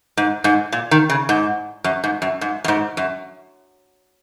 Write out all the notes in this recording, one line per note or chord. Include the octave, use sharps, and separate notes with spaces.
G#2
G#2
A#2
D#3
C#3
G#2
F#2
G#2
F#2
G#2
F#2
G#2
F#2